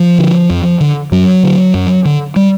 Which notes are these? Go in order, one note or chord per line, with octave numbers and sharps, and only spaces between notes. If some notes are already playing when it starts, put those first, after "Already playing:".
Already playing: F3
D3
F2
D3
F#2 F#3
D3
F#2
D3
G3